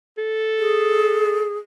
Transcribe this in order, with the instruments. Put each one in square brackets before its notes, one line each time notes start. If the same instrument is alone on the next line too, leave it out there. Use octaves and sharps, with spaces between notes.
[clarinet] A4
[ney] G#4